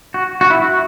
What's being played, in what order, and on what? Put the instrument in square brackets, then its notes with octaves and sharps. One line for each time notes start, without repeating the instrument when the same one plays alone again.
[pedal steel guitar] F#4
F#4
E4
F#4